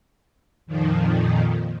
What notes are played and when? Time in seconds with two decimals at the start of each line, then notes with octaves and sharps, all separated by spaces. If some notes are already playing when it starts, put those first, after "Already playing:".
0.66 F2 A#2 D#3 F3